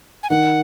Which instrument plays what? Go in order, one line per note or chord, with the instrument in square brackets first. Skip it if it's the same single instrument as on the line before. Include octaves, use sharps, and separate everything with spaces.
[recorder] G#5
[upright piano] D#3 [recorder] F#5